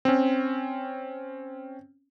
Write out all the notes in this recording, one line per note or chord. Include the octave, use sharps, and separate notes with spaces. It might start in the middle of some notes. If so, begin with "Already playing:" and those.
C4 C#4